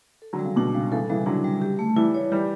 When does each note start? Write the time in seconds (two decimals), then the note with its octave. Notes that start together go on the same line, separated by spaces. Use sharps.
0.22 A4
0.33 D3 F#3
0.39 G3
0.45 C#3
0.56 B2 D4
0.74 C#3 G3
0.92 C#3 E3 A4
1.09 C#3 E3 G3
1.26 D3 F#3 D4
1.44 G3
1.62 G4
1.79 A3
1.96 E3 G3 E4
2.14 C#5
2.31 E3 G3 G4